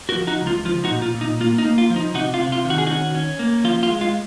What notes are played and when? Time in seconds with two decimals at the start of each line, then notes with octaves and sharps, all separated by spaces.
0.09 F#4 A#4
0.15 F3
0.27 D#4 F#4
0.41 C#2
0.47 F4
0.65 F3 F4
0.84 D#4 F#4
0.91 A#2
1.02 F4
1.15 A#2
1.21 D#4
1.40 A#3 F4
1.58 D#4
1.65 A#3
1.78 F4
1.90 F3
1.96 D#4
2.14 C3 D#4 F#4
2.34 F4
2.40 C3
2.52 F4
2.65 D#3
2.70 F#4
2.78 G#4
2.86 C#4 D#4 F#4
3.15 C#4
3.39 A#3
3.64 F3 F4
3.83 F4
3.89 G#3
4.01 F4